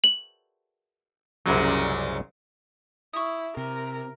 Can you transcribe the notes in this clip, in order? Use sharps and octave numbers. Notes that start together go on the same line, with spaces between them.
F#7
C2 F#2 A#2 C#3 F#3 G#3
E4 C#6 D#6
C3 A#4